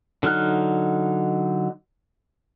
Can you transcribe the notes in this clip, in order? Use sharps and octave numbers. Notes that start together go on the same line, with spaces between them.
D3 F#3 D#4 F6 F#6